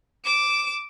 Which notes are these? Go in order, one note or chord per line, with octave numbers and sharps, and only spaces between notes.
D6 E7